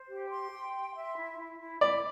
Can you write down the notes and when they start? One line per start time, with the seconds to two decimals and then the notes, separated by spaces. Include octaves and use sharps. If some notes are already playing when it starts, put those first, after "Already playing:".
Already playing: C5
0.08 G4
0.30 C6
0.51 G5
0.73 C6
0.95 E5
1.16 E4
1.38 E4
1.60 E4
1.81 E4 D5